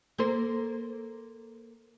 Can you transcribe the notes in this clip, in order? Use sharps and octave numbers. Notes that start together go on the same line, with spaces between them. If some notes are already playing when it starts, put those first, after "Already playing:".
A#3 A4 C5